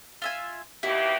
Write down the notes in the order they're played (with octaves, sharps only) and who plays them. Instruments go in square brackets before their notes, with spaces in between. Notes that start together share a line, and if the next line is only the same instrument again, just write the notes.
[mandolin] F4 E5 G#5
[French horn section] D#2 B2 G4 [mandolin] E4